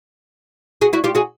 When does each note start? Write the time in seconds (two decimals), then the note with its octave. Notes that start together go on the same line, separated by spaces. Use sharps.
0.81 F#4 G#4
0.93 E4 F#4
1.04 F4 G4
1.15 F#4 G#4